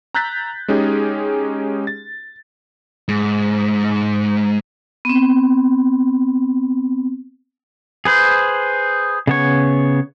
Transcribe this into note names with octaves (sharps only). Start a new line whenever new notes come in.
A#5 E6 F#6 G6 A6 B6
G#3 C#4 D#4 G4 G#4
A6
G#2
B3 C4
G#4 B4 C5
C#3 B3 C#5